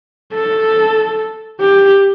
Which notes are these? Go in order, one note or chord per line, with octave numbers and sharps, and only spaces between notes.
A4
G4